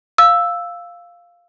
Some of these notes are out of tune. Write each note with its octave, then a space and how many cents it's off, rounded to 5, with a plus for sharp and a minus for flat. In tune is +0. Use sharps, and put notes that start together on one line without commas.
F5 +0 E6 +0